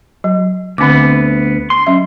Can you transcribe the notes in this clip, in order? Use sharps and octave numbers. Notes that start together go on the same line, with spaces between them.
F#3
D2 D3 B3 C4 D6
C6
F#3 C#4 E5